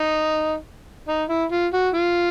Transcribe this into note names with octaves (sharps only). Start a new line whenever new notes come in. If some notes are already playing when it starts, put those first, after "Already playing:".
Already playing: D#4
D#4
E4
F4
F#4
F4